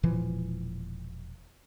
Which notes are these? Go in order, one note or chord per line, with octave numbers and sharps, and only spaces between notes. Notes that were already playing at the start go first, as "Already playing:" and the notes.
E1 A#2 E3 F3